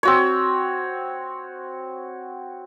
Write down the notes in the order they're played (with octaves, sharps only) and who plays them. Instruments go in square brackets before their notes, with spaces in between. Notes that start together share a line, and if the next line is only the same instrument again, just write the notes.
[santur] C4 F#4 C#5